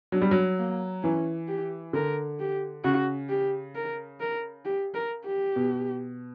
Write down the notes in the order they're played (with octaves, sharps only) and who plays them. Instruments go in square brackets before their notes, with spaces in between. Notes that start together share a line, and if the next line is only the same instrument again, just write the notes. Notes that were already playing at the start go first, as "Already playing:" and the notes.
[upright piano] F#3 [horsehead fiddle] D4
[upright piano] G3
F#3
[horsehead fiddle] A#3
[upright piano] E3 [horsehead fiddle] C#4
[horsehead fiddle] G4
[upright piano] D3 [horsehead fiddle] A#4
[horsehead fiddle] G4
[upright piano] C#3 [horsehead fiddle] F#4
[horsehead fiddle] G4
A#4
A#4
G4
A#4
G4
[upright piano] B2